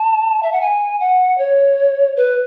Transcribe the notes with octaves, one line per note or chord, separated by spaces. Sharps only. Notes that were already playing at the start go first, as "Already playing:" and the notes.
Already playing: A5
E5
F#5
G#5
F#5
C#5
B4